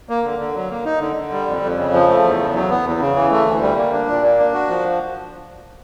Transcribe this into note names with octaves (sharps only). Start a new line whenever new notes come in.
A#3
D3
D3
F#3
A#3
D#4
D3
D3
G3
F2
F2
C#3
F3
A3
E2
C#3
F#3
B3
E2
C#3
E3
A3
D2
G3
A#3
D4
A#2
A#3
D4
F#4
F3